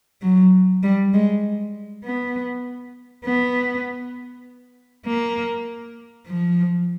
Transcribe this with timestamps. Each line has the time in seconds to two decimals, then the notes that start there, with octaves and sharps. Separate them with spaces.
0.22 F#3
0.83 G3
1.14 G#3
2.04 B3
3.25 B3
5.07 A#3
6.27 F3